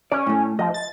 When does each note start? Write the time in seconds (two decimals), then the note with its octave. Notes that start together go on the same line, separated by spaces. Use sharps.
0.12 C#4 D5
0.27 A2 A3
0.59 F3 D#5
0.74 A6